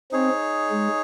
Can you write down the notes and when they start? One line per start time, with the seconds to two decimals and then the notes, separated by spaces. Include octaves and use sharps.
0.12 C4 D#4 G#4 C#5
0.70 G#3